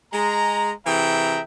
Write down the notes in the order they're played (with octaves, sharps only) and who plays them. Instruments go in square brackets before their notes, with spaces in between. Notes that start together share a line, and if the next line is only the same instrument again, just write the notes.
[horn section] G#3 A#5
C3 E3 G#4 E5 G5 A#5